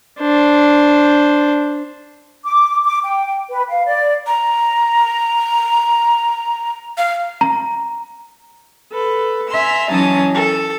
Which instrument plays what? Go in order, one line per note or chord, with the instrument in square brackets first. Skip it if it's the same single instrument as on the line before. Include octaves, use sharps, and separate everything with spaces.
[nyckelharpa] D4 C5
[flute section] D6
D6
G5
B4
F5
D5
[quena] A#5
F5
[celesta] A#5
[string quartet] A4 B4
E5 G#5 A#5 C6 E6
E3 F#3 C#4 D#4 A5 D#6
A4